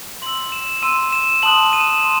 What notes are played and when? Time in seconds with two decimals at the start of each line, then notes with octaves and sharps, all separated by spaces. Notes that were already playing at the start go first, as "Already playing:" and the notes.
0.22 C6 E6 F#7
0.52 E7
0.82 C6 E6 D#7
1.13 E7
1.43 A5 C6 D#6 F#6 F#7
1.73 D#7
1.80 E7
1.87 D#7
2.03 A5 C6 E7